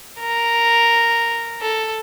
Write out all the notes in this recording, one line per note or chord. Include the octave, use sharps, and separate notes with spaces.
A#4
A4